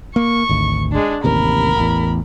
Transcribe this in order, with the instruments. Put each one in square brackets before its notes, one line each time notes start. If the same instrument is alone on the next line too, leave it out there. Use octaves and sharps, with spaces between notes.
[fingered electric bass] A#3 [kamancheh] C#6
[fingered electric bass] G#1 D2
[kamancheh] G#3 D4
[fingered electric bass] A1 D#2 C3 [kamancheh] A#4 B5
[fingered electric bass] A1 E2